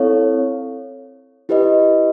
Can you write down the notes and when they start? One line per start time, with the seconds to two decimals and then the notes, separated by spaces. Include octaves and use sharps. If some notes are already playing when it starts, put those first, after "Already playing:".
Already playing: C4 E4 A4 C#5 F5
1.49 E4 G4 B4 D#5